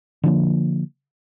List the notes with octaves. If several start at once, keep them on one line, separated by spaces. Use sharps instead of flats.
D3 F3 A#3